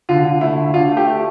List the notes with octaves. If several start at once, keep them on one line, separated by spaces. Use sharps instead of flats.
D3 F4
D3
A3 E4
D3
D4 F4
A3
G4
A3